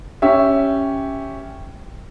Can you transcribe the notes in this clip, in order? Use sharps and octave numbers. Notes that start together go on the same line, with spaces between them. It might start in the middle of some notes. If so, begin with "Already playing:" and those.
C#4 G4 E5